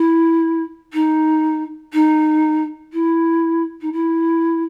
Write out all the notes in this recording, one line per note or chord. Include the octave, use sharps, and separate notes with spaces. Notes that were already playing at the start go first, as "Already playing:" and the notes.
Already playing: E4
D#4
D#4
E4
D#4
E4